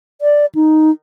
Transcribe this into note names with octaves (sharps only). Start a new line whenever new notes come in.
D5
D#4